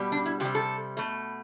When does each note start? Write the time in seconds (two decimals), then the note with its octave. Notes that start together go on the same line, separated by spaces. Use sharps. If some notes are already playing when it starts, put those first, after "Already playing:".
Already playing: B2 G3
0.12 D4
0.26 E4
0.40 C3 G4
0.45 G3
0.55 A4
0.97 B2 A3